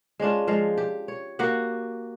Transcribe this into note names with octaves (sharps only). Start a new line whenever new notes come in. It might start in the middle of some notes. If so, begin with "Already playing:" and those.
G#3 C#4 D4 F4
F3 G#3 F5
G4
C#5
A#3 F#4 G4 F#5